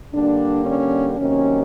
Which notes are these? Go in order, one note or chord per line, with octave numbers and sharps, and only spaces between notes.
D3 G3 A#3 D4
C#4
C3 D#3 F#3 A#3 C#4